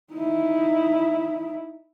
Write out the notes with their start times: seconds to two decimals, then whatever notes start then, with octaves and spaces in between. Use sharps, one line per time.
0.12 D#4 E4